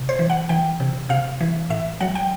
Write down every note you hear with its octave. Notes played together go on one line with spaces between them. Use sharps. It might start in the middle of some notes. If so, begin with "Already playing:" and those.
Already playing: C3
C5
E3
F#5
E3 G5
C3
C3 F5
E3
A2 E5
F#3 F#5
G5